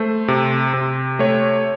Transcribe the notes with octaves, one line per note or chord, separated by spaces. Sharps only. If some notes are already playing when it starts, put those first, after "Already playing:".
Already playing: A3 C5
C3
C3
A3 C#5